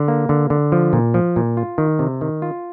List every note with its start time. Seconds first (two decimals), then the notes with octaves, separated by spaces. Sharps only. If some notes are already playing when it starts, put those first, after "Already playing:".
Already playing: D3
0.08 A#3
0.29 D3
0.50 D3
0.72 F3
0.93 A#2
1.14 F3
1.36 A#2
1.57 F4
1.78 D#3
1.99 C3
2.21 D#3
2.42 F4